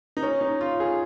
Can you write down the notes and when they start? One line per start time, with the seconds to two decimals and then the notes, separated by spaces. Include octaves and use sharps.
0.17 D#4
0.23 C#4
0.41 D#4
0.61 F4
0.80 G#4